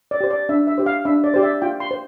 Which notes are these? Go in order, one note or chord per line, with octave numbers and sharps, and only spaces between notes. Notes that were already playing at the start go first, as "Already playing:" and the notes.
D5
G4 C5
D5
D4 E5
E5
G4 C5
F5
D4 E5
D5
G4 C5 D5
E5
F4 G5
C6
C5